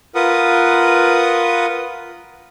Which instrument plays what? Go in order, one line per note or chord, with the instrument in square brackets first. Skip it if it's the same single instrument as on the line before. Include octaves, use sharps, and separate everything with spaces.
[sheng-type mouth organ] F4 A#4 B4 F#5 D#6